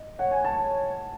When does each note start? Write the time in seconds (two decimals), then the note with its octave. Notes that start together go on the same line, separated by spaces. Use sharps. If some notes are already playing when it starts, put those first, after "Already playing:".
Already playing: D#5
0.18 C#5 F#5
0.31 G#5
0.45 A5